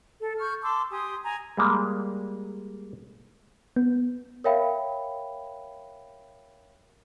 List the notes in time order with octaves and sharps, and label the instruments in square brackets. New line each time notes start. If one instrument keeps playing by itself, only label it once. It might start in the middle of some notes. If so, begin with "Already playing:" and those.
[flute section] A4
C#6 F6 G6
A5 C6 D6 E6
G4 G#5 C6 D#6
G#5 A#5
[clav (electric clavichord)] G3 G#3 A#3
[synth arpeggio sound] B3
[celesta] A#4 C#5 E5 F5 G5 B5